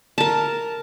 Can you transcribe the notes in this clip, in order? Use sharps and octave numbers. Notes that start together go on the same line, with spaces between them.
A#4 A5